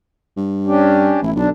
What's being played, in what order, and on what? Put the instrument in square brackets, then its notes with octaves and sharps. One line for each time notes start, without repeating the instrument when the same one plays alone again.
[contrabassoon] G2
[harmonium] C#4 D4 G4
[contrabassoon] A1 [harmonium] G2 B2 E4
[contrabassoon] B1 [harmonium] D3 D4